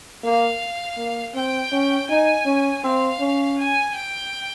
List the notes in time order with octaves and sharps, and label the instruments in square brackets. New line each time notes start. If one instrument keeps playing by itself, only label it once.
[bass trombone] A#3 [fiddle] F5
[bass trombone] A#3
[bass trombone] C4 [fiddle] G5
[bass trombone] C#4
[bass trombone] D#4 [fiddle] G#5
[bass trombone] C#4
[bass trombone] C4 [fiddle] F5
[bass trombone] C#4
[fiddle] G#5
G5